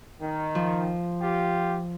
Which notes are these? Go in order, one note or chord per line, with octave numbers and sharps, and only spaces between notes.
D#3
F3
F4 G4